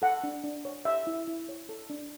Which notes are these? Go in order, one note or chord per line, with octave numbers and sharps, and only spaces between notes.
A4 F#5
D4
D4
C#5
G4 E5
E4
E4
C#5
A4
D4